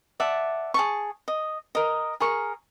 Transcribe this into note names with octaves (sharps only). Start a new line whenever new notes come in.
D5 E5 F#5 A5
G#4 A5 C#6
D#5
A#4 D#5
G#4 A#4 C#6